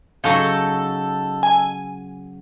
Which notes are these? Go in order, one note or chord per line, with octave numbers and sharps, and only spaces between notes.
C#3 F#3 D#4 A4 C#6
G#5